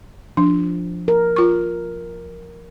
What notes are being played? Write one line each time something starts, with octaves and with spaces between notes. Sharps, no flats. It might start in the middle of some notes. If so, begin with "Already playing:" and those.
F3 D4
A#4
F4 C#6